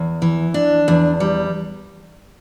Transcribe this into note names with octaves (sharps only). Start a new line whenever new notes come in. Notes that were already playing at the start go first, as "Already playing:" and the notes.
Already playing: E2
E3
D4
E2
G3